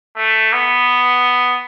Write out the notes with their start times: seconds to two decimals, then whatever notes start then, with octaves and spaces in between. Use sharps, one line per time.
0.17 A3
0.53 B3